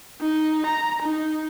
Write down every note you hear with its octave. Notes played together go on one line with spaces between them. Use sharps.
D#4
A#5
D#4